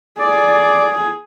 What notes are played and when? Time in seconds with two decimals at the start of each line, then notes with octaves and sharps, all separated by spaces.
0.19 G#4 D5